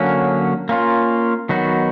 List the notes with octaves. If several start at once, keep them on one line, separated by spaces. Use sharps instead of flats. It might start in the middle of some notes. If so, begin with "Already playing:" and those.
Already playing: D3 F#3 A#3 C#4
A#3 C#4 F4
D#3 F#3 B3 D#4 F#4